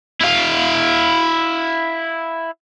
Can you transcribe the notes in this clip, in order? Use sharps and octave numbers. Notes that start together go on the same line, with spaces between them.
E4 F5